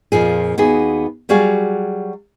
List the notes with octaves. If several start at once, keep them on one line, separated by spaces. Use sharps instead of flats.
F2 A#2 F3 G#4
D#2 B3 F#4 G#4
F#3 G3 F#4 G#4 F5